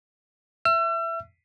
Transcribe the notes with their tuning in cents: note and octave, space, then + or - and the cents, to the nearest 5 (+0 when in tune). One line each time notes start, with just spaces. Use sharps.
E5 +10 E6 +40